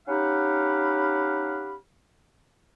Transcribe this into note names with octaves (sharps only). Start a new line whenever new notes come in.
C#4 D#4 G4 F5 F#5 B5